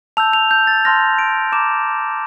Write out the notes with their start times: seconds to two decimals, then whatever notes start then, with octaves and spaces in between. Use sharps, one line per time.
0.17 A5 E6 G6 F7
0.33 F7
0.51 G6
0.67 A6
0.85 A5 C6 F6 A#6
1.19 D7
1.52 A#5 D6 G6 E7